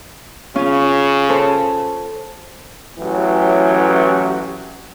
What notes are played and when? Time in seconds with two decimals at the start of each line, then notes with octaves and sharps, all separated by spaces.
0.55 C#3 C#4 F4
1.29 A4 C5
2.99 A1 E3 F#3 C#4 G4